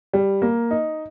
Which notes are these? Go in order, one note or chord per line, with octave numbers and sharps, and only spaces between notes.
G3
A#3
D#4